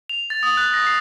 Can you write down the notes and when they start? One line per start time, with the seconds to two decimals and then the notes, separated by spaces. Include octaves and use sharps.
0.09 F7
0.30 A6
0.43 D#6
0.57 F#6
0.74 A#6
0.87 C7